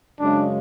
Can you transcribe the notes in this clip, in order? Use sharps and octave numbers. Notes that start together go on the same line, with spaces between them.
F#2 C#3 G#3 D4